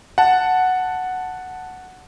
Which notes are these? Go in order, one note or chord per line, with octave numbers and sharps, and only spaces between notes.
F#5 A5